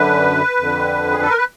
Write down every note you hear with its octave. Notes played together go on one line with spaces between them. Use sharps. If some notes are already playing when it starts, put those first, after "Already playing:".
Already playing: F#2 D3 B4
F2 D3
G#4
A4
A#4
B4